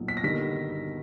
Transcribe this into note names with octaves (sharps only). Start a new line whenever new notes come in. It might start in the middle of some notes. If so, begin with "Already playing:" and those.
Already playing: B1 A#2
B6
A#6
G1 G2 D#3 G3 B6